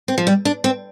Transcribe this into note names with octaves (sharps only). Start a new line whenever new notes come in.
C4
F3
G3
D4
C4